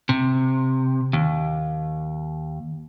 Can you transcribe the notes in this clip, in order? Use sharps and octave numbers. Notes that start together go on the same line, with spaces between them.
C3
D#2